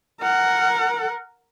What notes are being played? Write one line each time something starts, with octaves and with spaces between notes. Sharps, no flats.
A#4 F#5